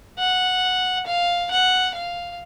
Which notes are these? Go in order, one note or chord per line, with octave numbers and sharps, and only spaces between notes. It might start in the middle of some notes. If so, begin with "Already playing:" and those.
F#5
F5
F#5
F5